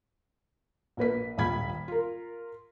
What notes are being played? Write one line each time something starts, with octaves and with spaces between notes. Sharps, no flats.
A#1 A#3 B4 B6
D#1 A#1 B5 G#6 B6
F4 A#4